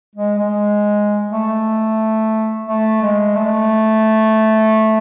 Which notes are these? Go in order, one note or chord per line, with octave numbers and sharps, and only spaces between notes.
G#3
G#3
A3
A3
G#3
A3